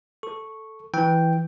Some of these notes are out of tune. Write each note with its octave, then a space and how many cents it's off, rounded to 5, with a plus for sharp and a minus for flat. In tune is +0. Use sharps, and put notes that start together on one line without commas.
A4 +0 C#6 -5
E3 +0 G5 +0